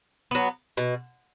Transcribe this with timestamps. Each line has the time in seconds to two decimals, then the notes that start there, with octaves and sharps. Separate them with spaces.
0.31 F#3 B3
0.77 B2